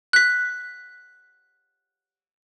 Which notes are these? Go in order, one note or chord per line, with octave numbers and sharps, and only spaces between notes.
F#6 B6